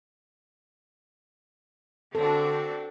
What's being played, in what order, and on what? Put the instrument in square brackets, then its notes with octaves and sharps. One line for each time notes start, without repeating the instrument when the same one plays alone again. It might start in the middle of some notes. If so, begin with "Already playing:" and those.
[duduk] D3 [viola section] C4 D4 F#4 [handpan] A4